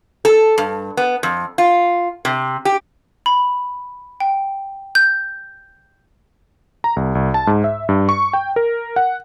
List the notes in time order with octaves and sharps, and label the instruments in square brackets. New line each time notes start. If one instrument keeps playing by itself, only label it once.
[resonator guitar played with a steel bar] A4
G2
B3
F2
F4
C3
G4
[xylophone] B5
G5
G6
[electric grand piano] A#5
C2
C2
A5
G#2
E5
G2
C#6
G5
A#4
F#5